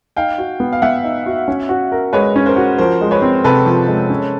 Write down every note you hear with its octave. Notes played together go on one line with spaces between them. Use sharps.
D#4 F5 G5
F#4
B3
F5
B3 E5 F#5
D#4
F#4
C#4
F#4
A#4
G#3 B4 C#5
C#4
A#4 C5
F#4
F3 A#4 C5
G#3
B4 C#5
C4
C3 A4 B4
F3
G#3
C#4